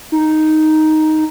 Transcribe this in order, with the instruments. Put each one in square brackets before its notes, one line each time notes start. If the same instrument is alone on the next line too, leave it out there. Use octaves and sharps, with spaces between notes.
[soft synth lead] D#4